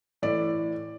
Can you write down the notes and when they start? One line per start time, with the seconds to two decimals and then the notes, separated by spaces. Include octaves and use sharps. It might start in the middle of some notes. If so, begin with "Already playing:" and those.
0.22 A2 E3 D5